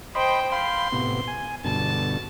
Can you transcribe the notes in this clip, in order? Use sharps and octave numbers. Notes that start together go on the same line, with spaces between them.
C5 D#5 G5 B5 C6
F5 G5 B5 C6
A2 C3 B3
G#5
G2 B2 D3 A5